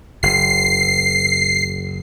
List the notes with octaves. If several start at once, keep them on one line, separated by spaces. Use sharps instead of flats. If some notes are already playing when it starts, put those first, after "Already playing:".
F#1 C7